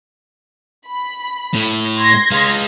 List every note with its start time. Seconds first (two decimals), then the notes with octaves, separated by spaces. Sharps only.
0.86 B5
1.54 A2
1.97 C6 G#6 A#6
2.31 G#3 F5